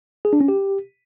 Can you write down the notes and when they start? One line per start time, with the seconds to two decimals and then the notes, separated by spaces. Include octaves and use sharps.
0.25 G#4
0.33 D4
0.41 C#4
0.48 G4